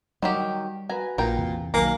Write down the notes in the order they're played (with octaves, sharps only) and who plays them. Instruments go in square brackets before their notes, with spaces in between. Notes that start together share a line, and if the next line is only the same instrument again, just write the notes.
[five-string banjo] D#3 F#3 G4 [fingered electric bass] G3
[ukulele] F#4 B4 [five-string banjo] G#5 A#5
[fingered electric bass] A#1 [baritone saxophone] A#2 [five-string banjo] A#4 G5
[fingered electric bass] E2 C3
[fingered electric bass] B1 D#3 F#3 [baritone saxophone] A#3 [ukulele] A#4 G#5 [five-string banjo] A#5